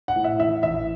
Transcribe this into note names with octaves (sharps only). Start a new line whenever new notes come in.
F#5
A2
E5
E3 E5
A1 E5